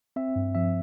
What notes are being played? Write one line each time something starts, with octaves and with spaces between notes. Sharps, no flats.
C4 E5
G2
F3 E5